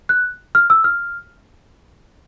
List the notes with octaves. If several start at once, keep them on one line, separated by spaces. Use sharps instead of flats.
F#6
F6
E6
F6